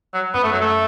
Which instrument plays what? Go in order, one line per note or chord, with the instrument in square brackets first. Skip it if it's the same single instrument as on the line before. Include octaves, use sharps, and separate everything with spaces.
[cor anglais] F#3
[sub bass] F#2 [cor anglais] B3
[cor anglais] A3
F#3
A3